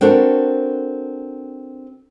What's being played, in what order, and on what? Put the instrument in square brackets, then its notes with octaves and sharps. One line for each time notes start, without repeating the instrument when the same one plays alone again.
[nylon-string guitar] C4 D4 F#4 A4 A#4